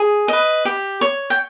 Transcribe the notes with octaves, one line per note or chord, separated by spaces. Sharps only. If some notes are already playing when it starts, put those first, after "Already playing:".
Already playing: G#4
B4 D#5
G4
C#5
G5